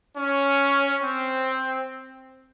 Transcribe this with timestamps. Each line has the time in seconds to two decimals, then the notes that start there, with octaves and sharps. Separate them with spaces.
0.17 C#4
1.03 C4